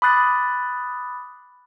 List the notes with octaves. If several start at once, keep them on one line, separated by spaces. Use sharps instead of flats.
B5 D6 D#6 F#6 A6 C7